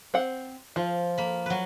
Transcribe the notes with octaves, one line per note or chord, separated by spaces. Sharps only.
C4 F#5
F3 F4
A#3 B5
F#3 B4